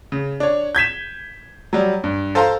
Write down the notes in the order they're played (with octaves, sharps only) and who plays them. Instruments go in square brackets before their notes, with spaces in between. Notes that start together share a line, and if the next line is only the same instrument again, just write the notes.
[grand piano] C#3
D4 C#5
G6 G#6 B6 E7
F#3 G3
G2
A4 C5 F5 A5 A#5 C6